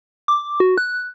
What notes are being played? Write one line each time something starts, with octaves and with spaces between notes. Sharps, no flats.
D6
F#4
F#6